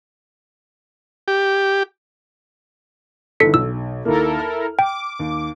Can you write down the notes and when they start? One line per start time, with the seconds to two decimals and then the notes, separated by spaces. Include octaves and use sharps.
1.28 G4
3.40 G1 D#3 E3 A4 B6 C#7
3.54 B1 E6
4.05 D#2 A#3 E4 A4 A#4
4.39 F6
4.79 G5 D6
5.19 D#2